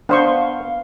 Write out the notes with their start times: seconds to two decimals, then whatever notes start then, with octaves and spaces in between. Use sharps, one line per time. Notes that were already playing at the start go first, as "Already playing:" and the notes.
0.09 B3 D4 C5 F5 C#6